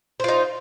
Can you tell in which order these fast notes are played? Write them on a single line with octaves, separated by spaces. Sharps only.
C5 F4 D#4